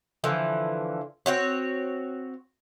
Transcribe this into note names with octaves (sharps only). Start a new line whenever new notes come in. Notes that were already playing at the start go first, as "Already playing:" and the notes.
D3 E3 F3
C4 F#4 C#5